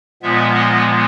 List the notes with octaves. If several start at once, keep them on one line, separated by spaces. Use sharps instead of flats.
A#2 F3 G#3 B3 E5
D#5